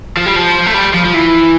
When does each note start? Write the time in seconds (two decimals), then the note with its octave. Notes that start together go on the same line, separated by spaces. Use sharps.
0.17 F3
0.26 G3
0.36 F3
0.66 A3
0.74 G3
0.94 F3
1.05 F3
1.14 E3